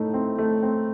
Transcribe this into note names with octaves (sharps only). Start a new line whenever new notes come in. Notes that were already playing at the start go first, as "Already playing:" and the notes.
Already playing: A2 A3 D#4
C4
A3
C4